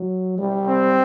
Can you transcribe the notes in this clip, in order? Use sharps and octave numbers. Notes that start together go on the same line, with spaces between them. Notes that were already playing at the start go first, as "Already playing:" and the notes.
Already playing: F#3
G3
C4